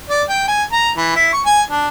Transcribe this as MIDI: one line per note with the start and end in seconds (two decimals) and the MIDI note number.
0.10 0.23 74
0.29 0.43 79
0.48 0.63 80
0.72 0.90 82
0.97 1.15 52
1.16 1.28 64
1.33 1.41 85
1.46 1.62 80
1.70 1.88 62